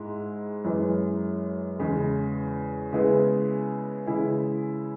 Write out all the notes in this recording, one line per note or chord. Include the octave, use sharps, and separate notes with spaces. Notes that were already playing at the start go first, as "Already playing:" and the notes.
Already playing: G#2 G#3 E4
F#2 E3 G#3
E2 C#3 G#3
C#3 G#3 B3 E4 G#4
C#3 E3 G#3 E4 G#4